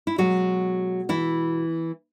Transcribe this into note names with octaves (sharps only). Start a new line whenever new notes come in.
E4
B2 F#3 G#3 F#4
E3 E4